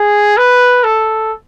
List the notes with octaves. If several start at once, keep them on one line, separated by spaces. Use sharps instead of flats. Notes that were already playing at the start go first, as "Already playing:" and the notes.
Already playing: G#4
B4
A4